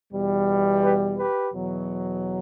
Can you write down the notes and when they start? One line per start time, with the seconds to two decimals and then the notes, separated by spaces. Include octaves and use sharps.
0.12 E2 B2 G3
0.83 G4 B4
1.17 G4 B4
1.53 E2 B2 F#3